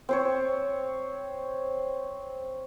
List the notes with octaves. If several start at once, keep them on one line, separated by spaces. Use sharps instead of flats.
C4 C5 C#5